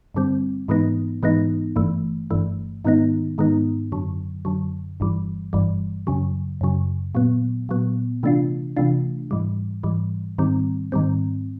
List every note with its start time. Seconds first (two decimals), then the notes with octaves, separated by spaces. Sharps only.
0.14 G2 D3 G3 C4
0.68 G#2 E3 G#3 B3 D#4
1.23 G#2 E3 G#3 B3 D#4
1.76 G1 G2 E3 A3
2.30 G1 G2 E3 A3
2.85 G#2 D#3 G#3 B3 D#4
3.38 G#2 D#3 G#3 B3 D#4
3.92 F#2 D3 F#3
4.45 F#2 D3 F#3
5.00 G1 G2 E3 G3
5.53 G1 G2 E3 G3
6.07 F#2 C#3 F#3
6.61 F#2 C#3 F#3
7.15 A#2 F#3 B3
7.69 A#2 F#3 B3
8.23 C3 E3 A3 D4 F4
8.77 C3 E3 A3 D4 F4
9.31 G#2 E3 G3
9.83 G#2 E3 G3
10.38 G#2 D#3 G3 C4
10.92 G#2 D#3 G3 C4